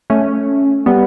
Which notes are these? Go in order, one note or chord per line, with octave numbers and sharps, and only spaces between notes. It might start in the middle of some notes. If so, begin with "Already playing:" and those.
A3 C#4
G3 B3